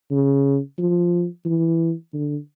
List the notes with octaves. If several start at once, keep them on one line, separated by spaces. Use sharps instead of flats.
C#3
F3
E3
D3